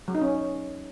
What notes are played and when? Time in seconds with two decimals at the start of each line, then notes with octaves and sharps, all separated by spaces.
0.08 F#3
0.15 D#4
0.21 C#4